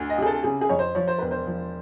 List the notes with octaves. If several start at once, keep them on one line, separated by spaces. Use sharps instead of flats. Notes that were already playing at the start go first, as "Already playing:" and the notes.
Already playing: D2
D#5
C3 G#4
A4
C#3 G#4
G#4
F2 C#5
C5
F3 C#5
C5
E1 B4
C5
F3